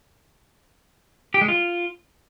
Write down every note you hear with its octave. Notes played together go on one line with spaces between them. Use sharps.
G4
G#3
F4